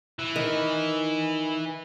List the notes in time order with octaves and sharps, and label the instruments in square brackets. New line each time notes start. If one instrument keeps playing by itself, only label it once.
[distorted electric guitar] E3
[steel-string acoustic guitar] D#3